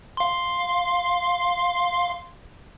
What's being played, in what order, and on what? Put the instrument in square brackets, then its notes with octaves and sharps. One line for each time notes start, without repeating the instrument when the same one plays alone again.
[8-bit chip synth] F5 C6